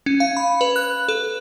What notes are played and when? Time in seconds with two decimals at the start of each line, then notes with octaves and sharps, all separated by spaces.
0.06 C#4
0.20 F5
0.37 B5
0.61 B4
0.76 F#6
1.08 A4